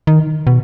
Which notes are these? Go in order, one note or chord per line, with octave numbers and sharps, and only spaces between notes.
D#3
B2